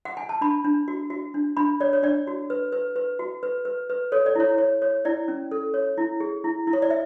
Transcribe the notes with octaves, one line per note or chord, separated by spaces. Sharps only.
F#5
G#5
A5
D4 B5
D4
F#4
F#4
D4
D4 B5
C#5 D5
C#5
D4 D5
F#4
B4
B4
B4
F#4
B4
B4
B4
A4 C#5
D5
E4 C#5
C#5
C#5
E4 D5
C#4
A4
C#5
E4
G#4
E4
E4
C#5
D5
E5